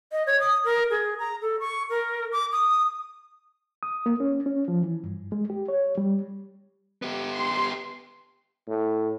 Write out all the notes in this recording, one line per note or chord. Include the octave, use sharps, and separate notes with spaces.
D#5
C#5
D#6
A#4
G#4
A#5
A4
C#6
A#4
D6
D#6
D#6
A#3
C#4
C#4
F3
E3
G2
G#3
G4
C#5
G3
B3 G4
C6
A2